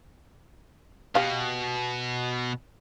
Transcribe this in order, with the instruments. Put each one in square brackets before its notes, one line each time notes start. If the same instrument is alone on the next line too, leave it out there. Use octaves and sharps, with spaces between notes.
[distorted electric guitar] B2 [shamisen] G4 F5